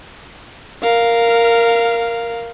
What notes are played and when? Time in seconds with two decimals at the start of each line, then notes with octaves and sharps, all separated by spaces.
0.83 A#4 F5